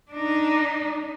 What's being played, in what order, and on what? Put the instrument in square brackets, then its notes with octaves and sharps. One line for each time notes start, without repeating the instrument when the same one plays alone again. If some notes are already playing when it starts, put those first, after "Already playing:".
[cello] D4 D#4